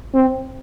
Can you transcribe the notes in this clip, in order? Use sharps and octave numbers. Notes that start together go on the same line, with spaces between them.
C4